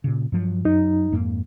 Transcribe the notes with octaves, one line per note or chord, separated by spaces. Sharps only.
A#2 C#3
G2 F3 F#3
F#2 F#3 D#4
F2 G#2 A#3